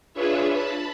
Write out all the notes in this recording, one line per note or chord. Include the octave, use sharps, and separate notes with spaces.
D4 F4 G#4 B4 C#5 E5
A5 B5